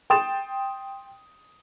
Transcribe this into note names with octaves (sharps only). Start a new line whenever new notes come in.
G5 C6 D#6 A6 E7